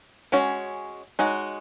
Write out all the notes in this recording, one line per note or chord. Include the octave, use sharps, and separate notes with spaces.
G#3 C#4 F#4 C#5
G#3 D#4 F#4 C#5